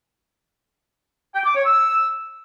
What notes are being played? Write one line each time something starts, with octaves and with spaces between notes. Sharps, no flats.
G5
D6
C#5
E6